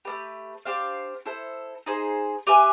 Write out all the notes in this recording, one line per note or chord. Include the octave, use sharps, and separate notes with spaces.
A3 D4 G4 B4
D4 G4 C5 F5
E4 A4 C5
D#4 G#4 C5
G4 B4 E5 G#5